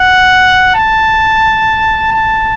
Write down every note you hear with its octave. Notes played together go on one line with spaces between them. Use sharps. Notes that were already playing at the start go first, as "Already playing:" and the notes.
Already playing: F#5
A5
A5